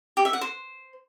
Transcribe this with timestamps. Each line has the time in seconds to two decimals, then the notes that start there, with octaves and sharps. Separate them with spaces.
0.17 G4
0.25 E5
0.33 F#5
0.41 C5